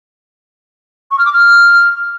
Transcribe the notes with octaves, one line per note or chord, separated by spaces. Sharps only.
C#6
F6
D6
F6